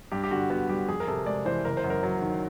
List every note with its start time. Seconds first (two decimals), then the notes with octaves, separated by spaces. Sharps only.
0.12 G2 G4
0.24 G4
0.31 D3 F#4
0.50 B3 F#4
0.69 G3 G4
0.88 F2 G#4
1.00 A#4
1.08 C3 A4
1.26 G#3 D5
1.45 E3 C5
1.65 F#1 A#4
1.77 C5
1.84 F#2
1.90 A#4
2.03 F#3
2.22 D#3